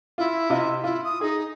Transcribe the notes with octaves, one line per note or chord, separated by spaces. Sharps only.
E4 F4
C3 F4 D#5
E4 F4
D#6
D#4 G#4